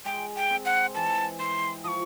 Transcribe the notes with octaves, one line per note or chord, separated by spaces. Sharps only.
G#3 G5
G5
C4
F#5
E3 A5
E4 C6
F3 C#6 D#6